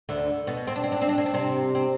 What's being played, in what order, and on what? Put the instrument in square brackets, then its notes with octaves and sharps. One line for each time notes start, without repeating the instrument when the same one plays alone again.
[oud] D2 D3
B2 B3
C4
D4
C4
D4
C4
D4
C4
D4
C3 C4
C4